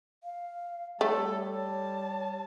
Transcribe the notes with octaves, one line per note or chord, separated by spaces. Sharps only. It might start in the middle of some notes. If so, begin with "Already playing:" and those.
F5
G3 A3 A4 C#5
C#5 A5